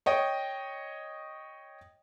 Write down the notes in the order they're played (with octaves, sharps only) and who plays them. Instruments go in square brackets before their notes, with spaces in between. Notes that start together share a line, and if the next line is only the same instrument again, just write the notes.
[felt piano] C#5 D#5 G5